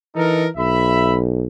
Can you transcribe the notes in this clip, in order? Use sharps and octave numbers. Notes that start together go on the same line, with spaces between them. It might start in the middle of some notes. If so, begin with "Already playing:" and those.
E3 D#4 A4 A#4
B1 E5 B5